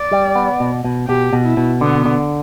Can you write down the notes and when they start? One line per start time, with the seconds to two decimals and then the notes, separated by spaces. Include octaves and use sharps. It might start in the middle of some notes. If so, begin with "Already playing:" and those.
Already playing: D5
0.11 G3
0.35 B3
0.60 B2
0.84 B2
1.08 B2 G4
1.33 B2
1.45 E4
1.57 B2
1.81 D3 B3
2.06 D3